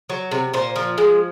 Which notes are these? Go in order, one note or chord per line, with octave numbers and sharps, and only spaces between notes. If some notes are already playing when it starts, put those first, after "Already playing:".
F#3
C3
A#2 C5
F3
G#3